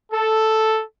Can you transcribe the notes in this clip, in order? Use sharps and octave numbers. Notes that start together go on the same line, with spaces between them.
A4